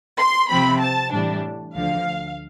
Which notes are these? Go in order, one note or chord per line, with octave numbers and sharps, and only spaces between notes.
C6
C3 F3 C4 B5
A5
A2 E3 G3 D4
D2 D3 F3 F5